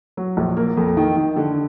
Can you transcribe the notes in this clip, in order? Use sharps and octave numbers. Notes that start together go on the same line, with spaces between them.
F#3
A#1
A#3
F2
D#3
D#3
D3